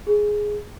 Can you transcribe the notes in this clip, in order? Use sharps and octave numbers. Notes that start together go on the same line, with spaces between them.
G#4